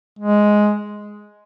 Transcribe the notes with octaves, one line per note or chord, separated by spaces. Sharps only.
G#3